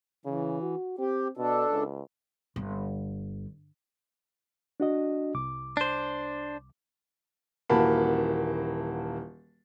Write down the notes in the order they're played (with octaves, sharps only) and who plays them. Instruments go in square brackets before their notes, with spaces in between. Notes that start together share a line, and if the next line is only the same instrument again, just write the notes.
[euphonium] C#3 [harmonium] E3
[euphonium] F#4
[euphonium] C4 [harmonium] G4
[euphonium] B2 [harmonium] D4 A4
[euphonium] C#2
[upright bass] G1
[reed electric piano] D4 F#4 D#5
C2 D6
[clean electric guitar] D4 C5
[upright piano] D#1 E3 A#3 F#4 A5 B5